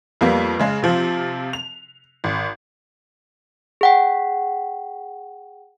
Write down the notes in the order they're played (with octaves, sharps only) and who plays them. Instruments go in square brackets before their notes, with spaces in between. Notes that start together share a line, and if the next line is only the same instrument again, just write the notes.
[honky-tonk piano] F2 G3 A#3 B3
C#3 G#3
C3 F3 C4
F7
G#1
[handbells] G#4 F#5 G5